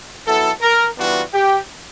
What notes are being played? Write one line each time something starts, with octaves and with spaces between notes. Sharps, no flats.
F#3 B3 E4 A4
A#4
E3 G3 B3 D4 F4 F#4
G4